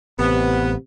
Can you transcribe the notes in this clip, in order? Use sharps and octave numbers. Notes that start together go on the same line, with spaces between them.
A1 C3 B3